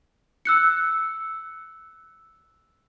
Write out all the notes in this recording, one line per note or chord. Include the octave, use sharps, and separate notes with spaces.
E6 F#6 C#7